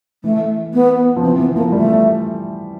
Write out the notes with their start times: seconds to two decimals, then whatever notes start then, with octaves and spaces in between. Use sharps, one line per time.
0.24 E3 A3
0.74 B3
1.16 F3
1.23 E3 C4
1.39 E3 B3
1.56 F3 A#3
1.72 G3 A3